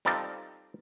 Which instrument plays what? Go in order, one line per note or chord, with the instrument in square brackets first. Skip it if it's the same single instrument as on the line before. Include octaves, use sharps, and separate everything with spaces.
[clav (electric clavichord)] G3 C4 D#4 F4 A4 D5